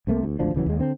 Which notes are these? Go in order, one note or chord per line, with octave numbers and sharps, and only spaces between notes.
C2 C3 A3 A#3
D2
G#1 D2 F3 D4
D1 C#3 E3 F#3
D#2 G#3
D3 C4